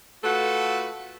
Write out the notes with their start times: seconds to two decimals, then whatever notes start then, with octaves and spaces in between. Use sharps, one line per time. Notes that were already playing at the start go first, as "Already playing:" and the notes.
0.24 A3 F4 F#4 A4 B4